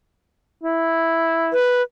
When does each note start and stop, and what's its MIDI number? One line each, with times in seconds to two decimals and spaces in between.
0.64 1.54 64
1.52 1.82 71